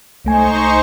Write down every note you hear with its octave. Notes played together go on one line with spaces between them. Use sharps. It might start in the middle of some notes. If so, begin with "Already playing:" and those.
C2 A3 D#4 C5 G#5 C#6